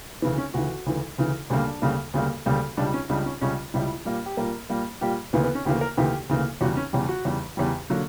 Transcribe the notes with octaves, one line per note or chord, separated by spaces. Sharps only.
D2 C#3 E3 B3
C#4
D2 C#3 E3 F#4
D2 C#3 E3
D2 C#3 E3
D2 C#3 G3 A#3 D4
D2 C#3 G3 A#3
D2 C#3 G3 A#3
D2 C#3 G3 A#3
C#2 C#3 G3 D4
C#4
C#2 C#3 G3 D4
C#4
C#2 C#3 G3 C#4
C#2 C#3 G3 E4
A#2 G3 A#3
G4
A#2 G3 A#3 A#4
A#2 G3 A#3
A#2 G3 A#3 G4
D2 C#3 E3 A#3 B3
B3
C#4
D2 C#3 E3 A#3 G4
A#4
D2 C#3 E3 A#3 G4
D2 C#3 E3 A#3
E2 C#3 G3 F#4
C#4
E2 C#3 G3 G4
F#4
E2 C#3 G3
E2 C#3 G3 G4
D3 F#3 A#3